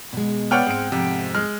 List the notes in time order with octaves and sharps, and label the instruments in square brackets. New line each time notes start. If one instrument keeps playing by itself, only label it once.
[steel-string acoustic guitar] B2 G#3
[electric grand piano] B3 C#5 D5 [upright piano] F#5 G5 F6
[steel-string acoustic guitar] G#2 [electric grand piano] G#3 C4 D7
[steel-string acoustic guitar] F2 G#2 [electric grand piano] C3
[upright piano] G#3 [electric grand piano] F6